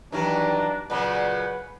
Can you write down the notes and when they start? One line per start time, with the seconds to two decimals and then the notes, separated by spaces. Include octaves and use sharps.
0.12 G2 D#3 E3 F#3 D4 A#5
0.90 A#2 C#3 F#3 B4 F#5